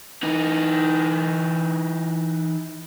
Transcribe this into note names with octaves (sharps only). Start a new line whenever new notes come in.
E3 D#4